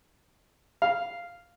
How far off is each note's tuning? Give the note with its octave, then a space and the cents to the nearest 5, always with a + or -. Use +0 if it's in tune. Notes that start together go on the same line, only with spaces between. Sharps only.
F5 -5